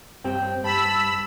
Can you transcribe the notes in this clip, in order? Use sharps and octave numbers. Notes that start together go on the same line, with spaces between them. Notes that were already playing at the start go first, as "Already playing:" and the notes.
G2 C4 G4 G5
G2 A5 B5 E6